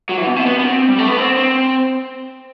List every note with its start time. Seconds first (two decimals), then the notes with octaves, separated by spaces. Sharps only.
0.09 F#3
0.18 E3
0.27 B2
0.36 C3
0.46 B3
0.59 B3
0.64 C4
0.88 G3
0.99 A3
1.08 B3
1.18 C4
1.37 C4